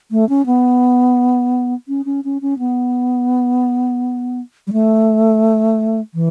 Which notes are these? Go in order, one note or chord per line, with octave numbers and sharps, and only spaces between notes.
A3
C#4
B3
C#4
C#4
C#4
C#4
B3
G3
A3
E3